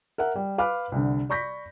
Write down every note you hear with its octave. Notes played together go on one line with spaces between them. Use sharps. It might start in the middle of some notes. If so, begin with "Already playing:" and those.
A#4 E5 F#5
G3
B4 F5 B5 D6 F6
C2 D3
D5 B5 C#6 G6 A#6 B6